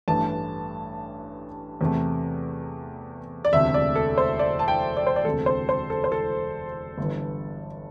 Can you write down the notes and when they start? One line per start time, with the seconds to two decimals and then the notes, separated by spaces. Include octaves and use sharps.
0.08 A1 G2 E3 A3 A5
1.81 E2 C3 A3
3.45 D5
3.53 E1 D2 C3 A3 E5
3.74 D5
3.96 A4
4.18 C5
4.39 D5
4.59 A5
4.68 G5
4.97 D5
5.07 C5
5.16 D5
5.25 E1 D2 C3 A4
5.46 C5
5.69 C5
5.90 A4
6.04 C5
6.12 A4
6.98 G1 G2 E3